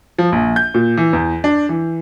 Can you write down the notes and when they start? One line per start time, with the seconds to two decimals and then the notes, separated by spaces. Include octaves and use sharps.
0.18 F3
0.32 A#1
0.56 G6
0.74 A#2
0.97 E3
1.13 E2
1.44 D4
1.69 E3